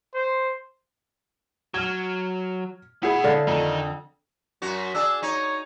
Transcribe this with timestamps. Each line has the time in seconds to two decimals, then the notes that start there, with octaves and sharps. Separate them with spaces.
0.14 C5
1.74 F#3 F6 G#6
3.03 B2 E4 G#4 F#5 B5
3.24 D3 F5
3.47 F2 D#3 D#4
4.62 F#2 F#4
4.95 D4 G#4 E6
5.23 D#4 C#5